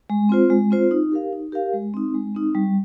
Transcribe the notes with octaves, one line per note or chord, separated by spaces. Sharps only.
G#3
C4 F4 C5
G#3
C4 F4 C5
D#4
G4 A#4 F5
D#4
G4 A#4 F5
G#3
C4 D#4
G#3
C4 D#4
G3